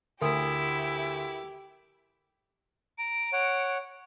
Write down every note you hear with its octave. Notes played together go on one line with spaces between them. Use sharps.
D2 E4 G4 A#4 D#6
A#5 D7
C#5 F#5